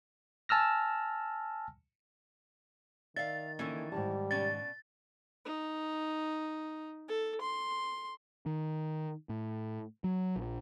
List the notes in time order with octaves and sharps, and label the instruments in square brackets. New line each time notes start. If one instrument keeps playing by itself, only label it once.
[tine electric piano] G#5 A5 E6 F6 A#6
[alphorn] D#3 [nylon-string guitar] D5 [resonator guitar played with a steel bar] E5 F5 [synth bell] A6
[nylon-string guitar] D3 A#3 [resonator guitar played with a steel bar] E3 C#4 E4
[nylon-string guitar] G#2 D#3 A5 [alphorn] G3
[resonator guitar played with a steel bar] B2 C#4 D5 [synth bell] A6
[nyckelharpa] D#4
A4
C6
[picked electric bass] D#3
A2
F#3
A#1